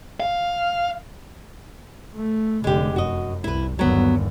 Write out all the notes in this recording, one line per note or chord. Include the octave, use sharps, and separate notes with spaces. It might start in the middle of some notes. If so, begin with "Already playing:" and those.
F5
A3
F1 D3 G#3 G4
F#2 F#4 D#5
C2 E4 B4
G1 D#2 F#3 B3